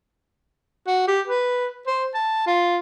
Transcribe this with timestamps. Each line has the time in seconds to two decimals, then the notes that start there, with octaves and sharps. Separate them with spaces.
0.87 F#4
1.08 G4
1.27 B4
1.87 C5
2.14 A5
2.47 F4